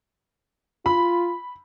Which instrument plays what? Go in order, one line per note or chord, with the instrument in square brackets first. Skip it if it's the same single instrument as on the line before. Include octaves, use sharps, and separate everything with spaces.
[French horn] F4 [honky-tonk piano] B5